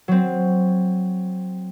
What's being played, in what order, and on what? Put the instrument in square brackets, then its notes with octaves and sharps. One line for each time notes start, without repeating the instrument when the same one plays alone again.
[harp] F#3 C4